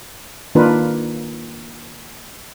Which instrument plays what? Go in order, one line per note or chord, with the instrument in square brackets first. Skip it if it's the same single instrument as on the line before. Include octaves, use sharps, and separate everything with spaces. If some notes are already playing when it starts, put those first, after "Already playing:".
[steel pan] D#3 A#3 D4 F4 A#4 B4